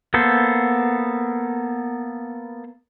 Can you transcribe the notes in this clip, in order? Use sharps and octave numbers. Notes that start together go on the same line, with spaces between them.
A#3 B3 A4 C5